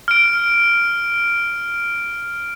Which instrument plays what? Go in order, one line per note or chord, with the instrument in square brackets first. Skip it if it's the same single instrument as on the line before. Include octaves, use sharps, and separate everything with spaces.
[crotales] F6 D7